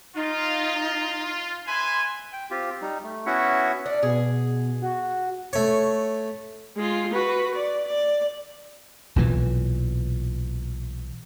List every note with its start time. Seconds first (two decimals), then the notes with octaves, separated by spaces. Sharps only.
0.15 D#4 F4
1.67 B4 E5 G#5 C6
2.33 G5
2.51 C4 F4 G4
2.82 G3 D#4
3.03 A3
3.26 B3 C#4 E4 F#4 E5 F#5
3.86 D4
4.03 B2 G#4
4.82 F#4
5.53 A3 C#5
6.77 G#3 F4
7.13 F#4 B4
7.55 D5
7.87 D5
9.16 B1 A#2 E3